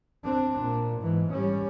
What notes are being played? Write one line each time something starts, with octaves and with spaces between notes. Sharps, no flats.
C4 D4
A#2
G#2 E3
G3 C#4